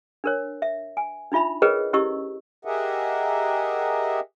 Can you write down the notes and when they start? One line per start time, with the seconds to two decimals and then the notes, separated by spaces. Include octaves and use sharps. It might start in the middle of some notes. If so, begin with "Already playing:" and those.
0.24 D4 A#4 C#5
0.62 E5
0.97 G#5
1.32 D4 D#4 F4 E5 B5
1.62 G#4 A#4 B4 C#5 D#5 G5
1.93 C#4 E4 G4 D#5 C#6 E6
2.65 G4 G#4 A#4 D#5 E5 F#5